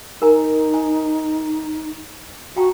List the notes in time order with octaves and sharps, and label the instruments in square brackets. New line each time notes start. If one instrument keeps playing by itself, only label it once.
[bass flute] D#4 [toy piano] A#4 G#5 A#5
[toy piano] G#5
[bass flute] F#4 [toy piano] G5 A5 A#5